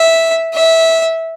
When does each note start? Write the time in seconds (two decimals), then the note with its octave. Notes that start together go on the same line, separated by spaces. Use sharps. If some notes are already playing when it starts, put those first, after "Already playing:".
Already playing: E5
0.53 E5